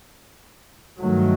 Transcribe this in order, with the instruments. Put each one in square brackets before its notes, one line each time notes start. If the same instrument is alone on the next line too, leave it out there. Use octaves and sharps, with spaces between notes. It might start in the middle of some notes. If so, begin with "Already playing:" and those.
[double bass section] G2 D#3 F#3 A3